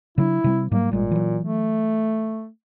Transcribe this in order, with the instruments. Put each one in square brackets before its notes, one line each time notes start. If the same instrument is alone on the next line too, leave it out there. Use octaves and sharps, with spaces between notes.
[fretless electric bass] C#3 F#3 D4 [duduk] E4
[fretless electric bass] C3 G3 C4
[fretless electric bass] G#2 F#3 G3 [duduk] A#3
[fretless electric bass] G#1 G3 G#3 [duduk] A#2
[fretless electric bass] E3 F#3
[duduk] A3